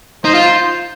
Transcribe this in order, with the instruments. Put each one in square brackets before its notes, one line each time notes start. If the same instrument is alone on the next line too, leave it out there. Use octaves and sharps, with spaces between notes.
[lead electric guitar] D#4 [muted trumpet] C5
[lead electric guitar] F4